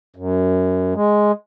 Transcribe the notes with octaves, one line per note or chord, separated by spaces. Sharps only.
F#2
G#3